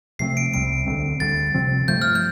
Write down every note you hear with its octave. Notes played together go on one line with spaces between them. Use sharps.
C3 F3 A3 C4 C7
D7
C2 C3 G3 C4 D7
D2 D3 A3 C4
D2 D3 G3 A6
C3 F3 C4
G2 F3 A3 G6
F6
G6